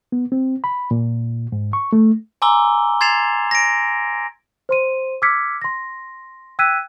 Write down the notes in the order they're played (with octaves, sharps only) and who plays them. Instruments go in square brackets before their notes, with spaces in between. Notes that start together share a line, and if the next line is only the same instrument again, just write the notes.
[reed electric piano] B3
C4
B5
A#2
G#2
C#6
A3
[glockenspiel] G#5 A#5 C6 D6 E6 G7
C6 G#6 A6 C7 E7 F7
A#6 D7
[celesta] C5 C6 D#7
D6 E6 F6 G#6 B6 C#7
C6 A#6
G5 E6 F#6 G#6 B6 D#7